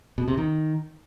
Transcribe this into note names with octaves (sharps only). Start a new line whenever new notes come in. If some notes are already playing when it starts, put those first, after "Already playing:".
B2
C3
D#3